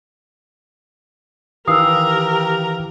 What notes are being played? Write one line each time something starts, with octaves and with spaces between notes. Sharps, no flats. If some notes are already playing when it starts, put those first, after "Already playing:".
D#3 E3 G4 A#4 F5 D#6 E6